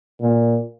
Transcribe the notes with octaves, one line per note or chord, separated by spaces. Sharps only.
A#2